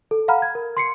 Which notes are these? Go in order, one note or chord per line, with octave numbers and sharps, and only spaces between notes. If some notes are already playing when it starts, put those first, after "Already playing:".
A4
F5 F#5 A#5 B5 F6
G#6
A#4
C6 C7 C#7